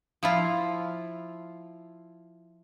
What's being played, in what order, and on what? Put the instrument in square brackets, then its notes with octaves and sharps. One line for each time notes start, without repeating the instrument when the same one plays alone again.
[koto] F3 E4 F4